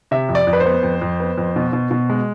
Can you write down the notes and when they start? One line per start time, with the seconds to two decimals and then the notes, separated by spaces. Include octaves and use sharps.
0.11 C3 E5
0.29 F2
0.35 D5
0.47 F2
0.53 B4
0.60 C5
0.65 B3
0.83 F2
1.02 F2
1.20 B3
1.38 F2
1.56 B2
1.73 B2
1.91 B2
2.10 G#3